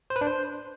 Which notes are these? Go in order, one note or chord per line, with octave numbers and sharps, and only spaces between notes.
C5
B4
D4
C5